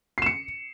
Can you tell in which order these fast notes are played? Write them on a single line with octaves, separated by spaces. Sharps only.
C7 E7 C#7